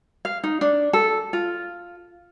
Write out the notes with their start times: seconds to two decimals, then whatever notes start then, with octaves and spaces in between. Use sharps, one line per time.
0.25 F5
0.44 D#4
0.61 D4
0.93 A4
1.33 F4